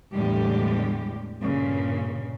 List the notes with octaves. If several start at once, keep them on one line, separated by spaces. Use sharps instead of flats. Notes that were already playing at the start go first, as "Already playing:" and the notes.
E2 A2 D3 G3 G#3 G4
G2 A#2 C#3